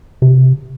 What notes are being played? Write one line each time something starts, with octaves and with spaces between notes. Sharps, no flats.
C3